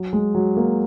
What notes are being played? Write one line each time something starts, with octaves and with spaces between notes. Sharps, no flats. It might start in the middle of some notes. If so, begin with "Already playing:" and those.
Already playing: F#3
G#3
F#3
A#3